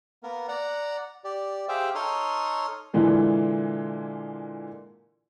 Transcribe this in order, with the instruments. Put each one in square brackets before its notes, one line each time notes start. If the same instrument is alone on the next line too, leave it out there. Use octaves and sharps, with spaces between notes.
[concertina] A#3 B3 A#4
D5 F#5 A#5
G4 D5
G4 G#4 C5 E5 F5 G5
D#4 A4 C#5 C6 D#6 F6
[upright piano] A#2 D3 E3 G#3 A#3